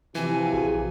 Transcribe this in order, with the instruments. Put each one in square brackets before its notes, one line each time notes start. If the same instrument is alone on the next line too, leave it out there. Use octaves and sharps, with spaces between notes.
[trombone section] C3 F3 [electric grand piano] E3 [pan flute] G#5
[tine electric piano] A#1 F#4 G#4